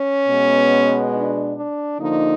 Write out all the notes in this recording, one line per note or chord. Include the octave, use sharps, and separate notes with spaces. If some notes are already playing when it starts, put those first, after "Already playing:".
Already playing: C#4
B2 G#3 B3
D4
D4
D3 F3 A#3 D#4